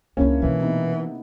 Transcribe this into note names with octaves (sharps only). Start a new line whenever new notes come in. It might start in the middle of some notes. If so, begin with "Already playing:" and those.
C#2 D3 A#3 C#4 D4 E4
B2 E3 G#3
C3 B3 D#4 E4